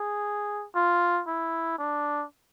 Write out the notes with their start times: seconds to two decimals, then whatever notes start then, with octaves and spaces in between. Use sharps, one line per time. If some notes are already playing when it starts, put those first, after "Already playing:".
Already playing: G#4
0.76 F4
1.28 E4
1.78 D4